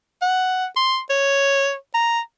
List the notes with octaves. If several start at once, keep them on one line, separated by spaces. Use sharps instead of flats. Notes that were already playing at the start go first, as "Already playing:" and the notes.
F#5
C6
C#5
A#5